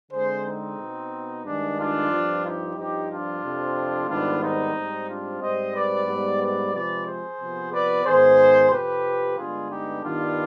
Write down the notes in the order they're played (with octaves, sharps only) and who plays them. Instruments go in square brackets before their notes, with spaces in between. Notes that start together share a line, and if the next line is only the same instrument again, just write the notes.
[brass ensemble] D3 G#3 C4 G#4 C5
C4 D#4
B2 B3
G2 D#3 G#3 D4
D4 F4
G2 F3 C4
D#4 G4
G2 F3 C4 D#4 G4
D4 F4
F2 C3 F3 C4
G#2 D#3 G3 B3 D4 F4
C4 D#4
G#2 G3 C4
D4 F4
G#2 G3 C4 C5 D#5
B4 D5
G#2 G3 B3
B4 D5
C3 F3 G#3 C4 B4 D5
G#4 C5
C3 F3 B3
B4 D5
G#2 D#3 B3 G#4 C5
F2 C3 F3 G4 B4
G2 D3 G#3 B3 F4 G#4
D#4 G4
G2 D#3 G3 B3 D4 F4